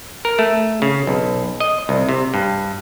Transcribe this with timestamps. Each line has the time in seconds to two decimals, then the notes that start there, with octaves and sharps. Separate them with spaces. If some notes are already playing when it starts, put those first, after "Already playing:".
0.25 A#4
0.39 A3
0.82 C#3
1.07 B1
1.60 D#5
1.89 C2
2.09 C3
2.34 G2